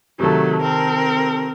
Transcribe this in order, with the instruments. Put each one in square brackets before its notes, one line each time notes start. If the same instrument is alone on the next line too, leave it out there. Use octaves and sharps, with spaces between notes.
[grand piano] C3 D#3 A4 [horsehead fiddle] F#3 A3
[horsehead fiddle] C4 A#4